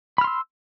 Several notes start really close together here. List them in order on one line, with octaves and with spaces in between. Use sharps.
B5 F6 C6 E6